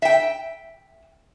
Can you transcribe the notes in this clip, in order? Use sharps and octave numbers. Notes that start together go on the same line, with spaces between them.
E5 G5